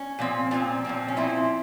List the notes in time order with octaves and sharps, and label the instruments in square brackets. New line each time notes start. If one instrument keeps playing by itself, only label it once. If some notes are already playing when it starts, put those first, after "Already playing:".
Already playing: [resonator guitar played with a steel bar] C#4
A#2 F3 C4
A#2 F3 C4
A#2 F3 C4
C#4
A#2 F3 C4 E4